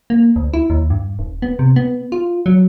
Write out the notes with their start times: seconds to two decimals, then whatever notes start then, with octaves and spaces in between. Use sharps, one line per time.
0.10 A#3
0.36 D2
0.54 E4
0.70 D#2
0.90 G2
1.19 D#1
1.42 B3
1.59 C3
1.76 B3
2.12 F4
2.46 F#3